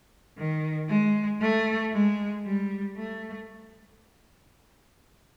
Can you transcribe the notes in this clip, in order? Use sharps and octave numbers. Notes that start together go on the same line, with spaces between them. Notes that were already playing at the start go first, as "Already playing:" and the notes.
D#3
G#3
A3
G#3
G3
A3